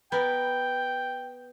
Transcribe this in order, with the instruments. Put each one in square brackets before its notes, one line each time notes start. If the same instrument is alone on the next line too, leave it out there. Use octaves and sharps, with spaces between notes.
[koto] B3 A#4 [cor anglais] G5